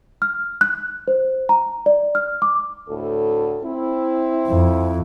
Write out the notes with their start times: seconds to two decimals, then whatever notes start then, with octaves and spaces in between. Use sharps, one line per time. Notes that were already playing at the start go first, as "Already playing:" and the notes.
0.22 F6
0.61 F#6
1.08 C5
1.49 A#5
1.86 D5
2.15 F6
2.42 D6
2.89 D2 A2 A4
3.63 C4 E4
4.47 F2